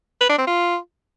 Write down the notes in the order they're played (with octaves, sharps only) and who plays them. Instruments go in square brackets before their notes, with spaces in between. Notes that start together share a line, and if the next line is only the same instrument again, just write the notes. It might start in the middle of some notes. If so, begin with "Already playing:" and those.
[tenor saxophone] B4
D4
C4
F4